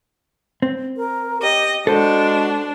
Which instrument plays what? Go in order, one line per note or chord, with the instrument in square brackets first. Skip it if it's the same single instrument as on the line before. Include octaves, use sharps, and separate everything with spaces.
[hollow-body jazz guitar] C4
[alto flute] A#4
[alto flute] G4 [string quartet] D#5
[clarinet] G#3 [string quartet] D4 [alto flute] F#4 [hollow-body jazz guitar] A4 C5